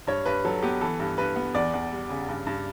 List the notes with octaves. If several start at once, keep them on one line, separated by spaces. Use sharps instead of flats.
G2 C#5
G2 B4
F#3 A4
B3 G4
E3 A4
G2
G2 B4
B3
E2 D5
E2
G3
C#3
G2
G2